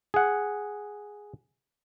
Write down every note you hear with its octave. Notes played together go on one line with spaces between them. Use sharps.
G#4 F#5